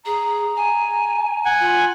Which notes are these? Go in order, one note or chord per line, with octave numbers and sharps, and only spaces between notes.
G#4 A#5
G#5
F#5 G#5
F4